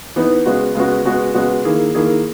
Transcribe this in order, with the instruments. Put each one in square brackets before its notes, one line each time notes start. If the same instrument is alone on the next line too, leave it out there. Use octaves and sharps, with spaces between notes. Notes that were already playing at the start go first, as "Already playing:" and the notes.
[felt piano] E3 B3 D#4
C#3 G#3 B3 F#4
C#3 G#3 B3 F#4
C#3 G#3 B3 F#4
C#3 G#3 B3 F#4
D#3 A#3 E4 G#4
D#3 A#3 E4 G#4